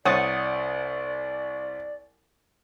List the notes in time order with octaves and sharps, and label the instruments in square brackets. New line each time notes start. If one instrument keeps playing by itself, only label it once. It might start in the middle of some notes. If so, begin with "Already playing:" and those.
[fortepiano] C2 [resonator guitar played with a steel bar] C#5 [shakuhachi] D5 [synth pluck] F#5 D#6 A6